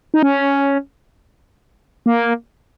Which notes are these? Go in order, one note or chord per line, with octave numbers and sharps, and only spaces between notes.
D#4
C#4
A#3